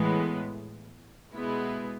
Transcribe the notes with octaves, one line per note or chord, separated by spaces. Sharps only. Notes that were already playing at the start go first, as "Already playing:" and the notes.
Already playing: A2 E3 G#3 B3
B2 G#3 B3 E4